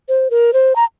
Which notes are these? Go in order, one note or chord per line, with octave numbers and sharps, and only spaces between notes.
C5
A#4
C5
A#5